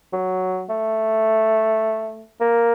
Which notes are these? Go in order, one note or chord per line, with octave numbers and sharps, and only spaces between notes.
F#3
A3
A#3